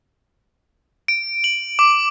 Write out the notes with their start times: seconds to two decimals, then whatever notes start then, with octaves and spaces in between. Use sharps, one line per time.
1.08 D7
1.44 F#7
1.79 D6